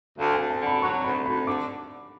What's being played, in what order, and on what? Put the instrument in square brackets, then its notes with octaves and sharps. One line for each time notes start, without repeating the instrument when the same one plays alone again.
[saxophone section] D2 [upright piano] F5
[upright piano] G#5
[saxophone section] D2
[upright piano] A5
[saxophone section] D3
[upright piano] B5
[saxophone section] F#3 [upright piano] C#6
[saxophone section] D2 [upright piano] B5
[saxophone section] D2 [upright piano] B5
[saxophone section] D3 [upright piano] D6